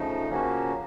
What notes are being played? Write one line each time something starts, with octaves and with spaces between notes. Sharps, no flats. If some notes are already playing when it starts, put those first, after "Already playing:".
Already playing: C#3 F3 A3 D#4
C#3 F3 A#3 C#4 F#4